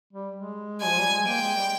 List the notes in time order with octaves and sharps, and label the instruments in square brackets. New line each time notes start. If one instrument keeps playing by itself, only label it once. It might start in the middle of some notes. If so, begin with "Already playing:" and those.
[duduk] G3
G#3
[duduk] F3 [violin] G#5
[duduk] G3
G#3
[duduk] A#3 [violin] G5
[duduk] G#3
G3